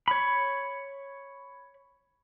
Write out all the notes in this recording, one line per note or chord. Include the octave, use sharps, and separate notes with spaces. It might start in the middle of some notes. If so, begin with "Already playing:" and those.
C#5 B5